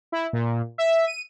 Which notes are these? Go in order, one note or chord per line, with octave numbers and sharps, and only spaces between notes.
E4
A#2
E5
D#7